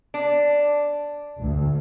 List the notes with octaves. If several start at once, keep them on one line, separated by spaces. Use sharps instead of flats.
D4
D2